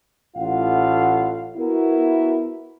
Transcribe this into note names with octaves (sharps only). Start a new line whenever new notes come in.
A1 A2 F4 F5 F#5
B3 E4 F#4 A#4